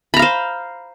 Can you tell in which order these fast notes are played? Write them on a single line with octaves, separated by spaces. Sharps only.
B5 A#5 F5 C5